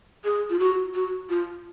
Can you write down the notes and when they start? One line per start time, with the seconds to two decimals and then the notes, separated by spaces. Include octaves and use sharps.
0.25 G#4
0.50 F4
0.60 F#4
0.95 F#4
1.30 F4